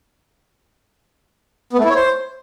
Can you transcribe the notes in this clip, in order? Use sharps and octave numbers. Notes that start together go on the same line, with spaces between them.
B3
A3
E4
C#5
C5